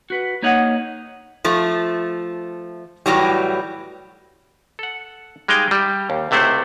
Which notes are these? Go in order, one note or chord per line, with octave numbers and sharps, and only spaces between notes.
F#4 B4
A#3 D#4 C#5 D#5 F#5
F3 A3
A2 E3 F#3 G3
A4 F#5
G3 G#3 D#4 F5 G5
G3 E5
D#2
C#2 C3 A3 E4 C5 F#5